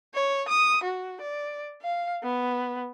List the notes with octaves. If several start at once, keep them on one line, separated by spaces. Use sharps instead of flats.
C#5
D#6
F#4
D5
F5
B3